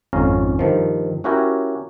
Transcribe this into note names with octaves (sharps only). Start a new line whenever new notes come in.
G#1 F2 C#4 F5 A#5
G2 D#3 F3
C#4 E4 F#4 G4 A#4 C#5